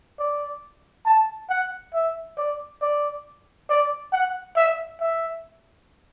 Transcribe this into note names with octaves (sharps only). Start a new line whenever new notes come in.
D5
A5
F#5
E5
D5
D5
D5
F#5
E5
E5